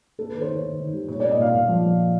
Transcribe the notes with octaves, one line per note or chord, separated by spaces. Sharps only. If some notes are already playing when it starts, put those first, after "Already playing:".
A#3 A4
D#3 B4
C5
D#3 C#5
D#3
D#3
G3
A#2 C#5
A#3 D5
D#5
A#2 F5
A#2
F3
A#2